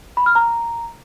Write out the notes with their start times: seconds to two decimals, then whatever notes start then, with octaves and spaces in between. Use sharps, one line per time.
0.17 B5
0.26 F6
0.35 A#5